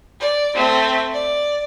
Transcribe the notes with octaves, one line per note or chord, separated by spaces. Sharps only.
D5
A3 C4
D5